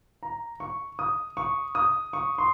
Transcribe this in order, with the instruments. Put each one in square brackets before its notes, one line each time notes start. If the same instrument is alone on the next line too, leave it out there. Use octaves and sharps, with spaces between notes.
[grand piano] A#5
C#6
D#6
C#6
D#6
C#6
C6